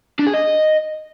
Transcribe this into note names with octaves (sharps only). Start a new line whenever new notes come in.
D4
G#4
D#5